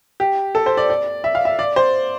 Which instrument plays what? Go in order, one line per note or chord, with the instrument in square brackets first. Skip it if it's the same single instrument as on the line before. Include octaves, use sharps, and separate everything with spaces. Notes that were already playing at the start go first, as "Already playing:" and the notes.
[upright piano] G4
A4
C5
D5
D5
E5
F5
E5
D5
C5